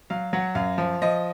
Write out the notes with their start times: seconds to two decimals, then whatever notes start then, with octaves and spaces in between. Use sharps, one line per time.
0.10 F#3 F5
0.33 F#3 F#5
0.55 F#2 F5
0.78 F3
1.02 F3 D#5